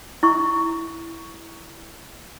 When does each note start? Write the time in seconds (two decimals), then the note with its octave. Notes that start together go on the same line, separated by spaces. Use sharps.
0.23 E4 C#6